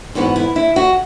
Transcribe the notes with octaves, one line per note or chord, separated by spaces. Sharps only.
G#2 E3 B3 F#4
E4
E4
F#4